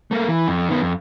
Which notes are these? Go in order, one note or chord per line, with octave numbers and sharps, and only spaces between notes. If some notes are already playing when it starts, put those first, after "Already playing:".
A3 A#3
E3
F2
D#3 B3
F2